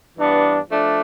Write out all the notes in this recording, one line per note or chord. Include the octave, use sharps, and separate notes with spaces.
G2 E3 B3 D4
F3 A3 D4